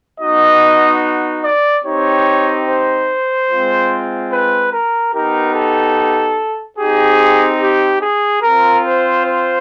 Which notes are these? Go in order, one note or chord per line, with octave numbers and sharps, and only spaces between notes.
B3 D#4 F#4 D#5
D5
C4 D#4 G4 C#5
C5
G#3 C4 F4
B4
A#4
B3 D#4 G4 A#4
A4
C4 D#4 G4 G#4
G4
G#4
C4 F4 A#4
C5
C5